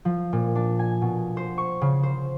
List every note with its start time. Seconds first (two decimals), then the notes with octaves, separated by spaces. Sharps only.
0.05 F3
0.33 A#2
0.55 D4
0.79 G#5
1.02 B2
1.37 C5
1.58 C#6
1.81 C#3
2.03 C5